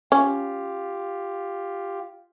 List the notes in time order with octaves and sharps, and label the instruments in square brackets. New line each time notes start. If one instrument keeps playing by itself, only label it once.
[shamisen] C#4 [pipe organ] F4 G4